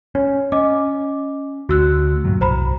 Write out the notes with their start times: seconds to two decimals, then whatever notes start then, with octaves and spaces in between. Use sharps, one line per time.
0.15 C#4 C#5
0.52 C#4 D#5 D6
1.69 D2 F#4 E6 F#6
2.24 G2 A#2 F#3
2.41 C2 C5 A#5 B5